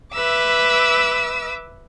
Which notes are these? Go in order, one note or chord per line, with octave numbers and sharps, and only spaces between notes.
B4 E5 D6 E6